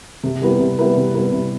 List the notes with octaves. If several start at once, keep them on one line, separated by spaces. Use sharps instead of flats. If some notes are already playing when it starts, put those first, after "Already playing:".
C3
G3 B3 E4 B4
C3
G3 B3 E4 B4
C3
G3 B3 E4 B4
C3